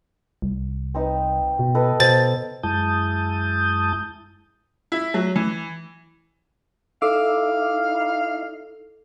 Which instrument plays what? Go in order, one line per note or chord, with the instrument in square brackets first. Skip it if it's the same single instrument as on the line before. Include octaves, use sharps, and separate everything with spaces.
[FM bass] C2
[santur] C4 D#4 B4
[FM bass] B2
[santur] A4 B4 D#5
[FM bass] B2 [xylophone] C5 A6 [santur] A5
[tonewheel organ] F#2 G#3 E4 A5 D#6 G6
[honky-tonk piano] E4
F#3
E3
[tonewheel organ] D#4 E4 [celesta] A4 [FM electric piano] E5 D6 E6 [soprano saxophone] F5